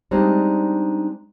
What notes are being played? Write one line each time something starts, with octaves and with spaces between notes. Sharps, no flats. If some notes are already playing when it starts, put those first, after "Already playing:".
G3 G#3 C4 D4 D#4